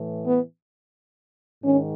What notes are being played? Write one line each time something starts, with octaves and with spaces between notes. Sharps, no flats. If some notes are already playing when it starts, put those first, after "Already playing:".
Already playing: A2 E3
B3
G#2 D#3 C#4